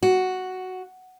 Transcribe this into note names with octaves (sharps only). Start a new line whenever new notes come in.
F#4